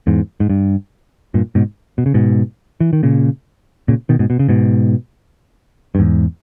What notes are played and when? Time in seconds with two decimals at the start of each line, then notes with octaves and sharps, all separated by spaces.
0.07 E2 G#2
0.40 G#2
0.50 G2
1.34 G2 A#2
1.55 G#2 B2
1.98 B2
2.06 C#3
2.14 G#2 B2
2.81 E3
2.93 D#3
3.03 A#2 C#3
3.88 A#2 C#3
4.09 B2 D#3
4.19 G#2 B2
4.30 B2
4.39 C#3
4.49 G#2 B2
5.95 G2
5.99 E2 G#2